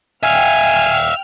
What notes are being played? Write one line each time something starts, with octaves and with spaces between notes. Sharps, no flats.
E5 F5 G5 G#5 F6